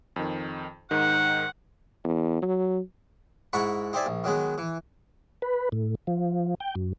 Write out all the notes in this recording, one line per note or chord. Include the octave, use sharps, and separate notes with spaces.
F2 D#3
G#2 D#3 F#5
E2
F#3
G#2 E4 F#5 A#5 B5 C#6
D#4 G4 C5 D5 E5 G#5
A#1
D#3 F#3 G#3 B3
E3
B4
A2
F3
G5
F#2